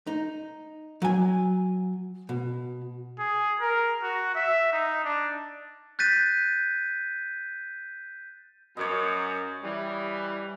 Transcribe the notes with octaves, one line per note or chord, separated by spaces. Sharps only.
D#4
F#3 G#5
B2
G#4
A#4
F#4
E5
D#4
D4
F#6 G6 A6 B6 D#7
F#2 C#5 D#5
E3 G3